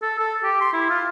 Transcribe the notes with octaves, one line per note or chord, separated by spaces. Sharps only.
A4
A4
G4
C6
E4
F4